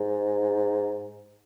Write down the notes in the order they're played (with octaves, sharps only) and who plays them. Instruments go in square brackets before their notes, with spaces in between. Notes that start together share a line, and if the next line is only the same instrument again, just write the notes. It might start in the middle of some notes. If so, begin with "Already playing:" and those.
Already playing: [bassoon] G#2